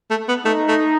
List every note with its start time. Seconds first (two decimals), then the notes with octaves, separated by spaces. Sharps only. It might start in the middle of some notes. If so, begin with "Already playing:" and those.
0.10 A3
0.28 B3
0.45 A3 D#4
0.68 A3